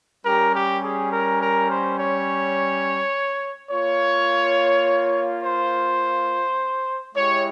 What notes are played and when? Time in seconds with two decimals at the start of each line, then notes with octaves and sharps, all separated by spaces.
0.25 G3 C#4 G4 A#4
0.54 G4
0.83 G#4
1.11 A#4
1.40 A#4
1.69 C5
1.98 C#5
3.71 A#3 F4 C#5
5.44 C5
7.15 G#3 E4 G4 C#5